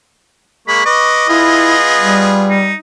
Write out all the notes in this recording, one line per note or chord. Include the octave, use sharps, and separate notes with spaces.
G#3 A#3 B5 C#6
B4 D#5 C#6 D6
B3 E4 F4 G#4
G3
D#4